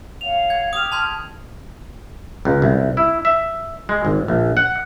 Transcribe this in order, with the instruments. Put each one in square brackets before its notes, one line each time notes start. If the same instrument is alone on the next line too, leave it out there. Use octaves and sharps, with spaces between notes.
[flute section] C#5 F5 F#5 [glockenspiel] F7
[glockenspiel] G#6
[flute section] G4 F6 [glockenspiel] D#6 F7
[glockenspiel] A5 C6 G#6
[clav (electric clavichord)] C#2
C2
E4
E5
G#3
G#1
A#1
F#5